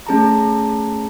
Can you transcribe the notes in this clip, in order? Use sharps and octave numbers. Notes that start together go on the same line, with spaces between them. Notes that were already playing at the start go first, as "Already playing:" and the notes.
A3 C#4 G#4 A5 A#5